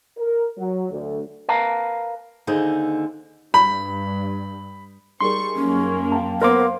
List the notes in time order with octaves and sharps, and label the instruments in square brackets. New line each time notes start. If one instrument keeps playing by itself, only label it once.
[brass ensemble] A#4
F#3
D2
[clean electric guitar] A#4 B4 F5 A5 A#5
[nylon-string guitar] D#2 D3 D#4 G#4 C5
[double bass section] G2 [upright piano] B5
[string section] G3 C#6 [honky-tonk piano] D#4 G#4 A#4 [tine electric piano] C6
[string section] F#2 A#3 [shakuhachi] C#4
[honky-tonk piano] F5 G5 A5
[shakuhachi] B3 [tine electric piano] A#4 D6 [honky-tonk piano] C5 F5 C6